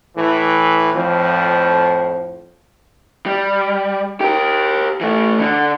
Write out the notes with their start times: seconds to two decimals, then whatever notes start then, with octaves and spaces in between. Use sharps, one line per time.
0.17 A2 E3
0.94 F2 A2 F3
3.26 G3
4.21 G4 A#4
5.01 E3 A3
5.40 D3